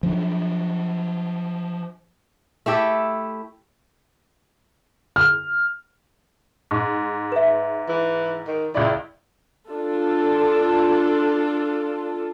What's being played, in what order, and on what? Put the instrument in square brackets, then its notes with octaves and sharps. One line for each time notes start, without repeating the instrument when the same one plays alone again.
[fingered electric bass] F3 F#3 D4
[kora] A3 E4 G4 A4
[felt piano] F6
[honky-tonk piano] G#2
[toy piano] B4 E5
[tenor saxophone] E3
D#3
[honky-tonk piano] C#2 D5 [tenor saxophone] E4
[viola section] D4 F4 A4